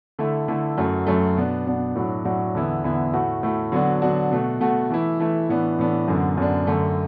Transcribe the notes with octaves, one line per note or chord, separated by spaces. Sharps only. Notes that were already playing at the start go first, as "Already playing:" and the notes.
D3 A3 E4
D3 A3 E4
F#2 F#3 A3
F#2 F#3 A3
B2 B3 D4
B2 B3 D4
A2 F#3 D4 F#4
A2 F#3 D4 F#4
E2 D3 B3 E4
E2 D3 B3 E4
A2 A3 F#4
A2 A3 F#4
D3 F#3 B3 D4 F#4
D3 F#3 B3 D4 F#4
B2 A3 F#4
B2 A3 F#4
E3 A3 E4
E3 A3 E4
A2 E3 B3 D4
A2 E3 B3 D4
F#2 D3 B3 D4
F#2 D3 B3 D4
F#2 D3 A3